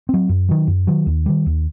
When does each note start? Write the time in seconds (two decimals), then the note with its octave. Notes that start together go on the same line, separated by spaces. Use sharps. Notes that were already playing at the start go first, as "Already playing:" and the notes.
0.09 F#3 C4
0.29 F#2
0.49 D#3 F#3
0.67 F#2
0.87 D#3 F#3
1.06 D#2
1.26 D#3 G3
1.46 D#2